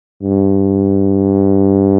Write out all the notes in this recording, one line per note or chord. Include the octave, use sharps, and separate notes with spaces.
G2